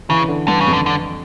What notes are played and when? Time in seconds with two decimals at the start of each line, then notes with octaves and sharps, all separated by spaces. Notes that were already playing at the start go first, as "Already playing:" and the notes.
0.09 C#3 E3
0.28 D3
0.48 G2 D3
0.60 C#3
0.67 F2
0.73 D3
0.86 D3